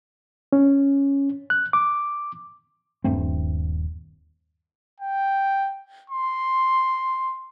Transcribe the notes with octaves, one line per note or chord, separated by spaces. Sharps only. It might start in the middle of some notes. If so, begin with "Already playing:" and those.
C#4
F#6
D6
D#1 G2 A3 C4
G5
C6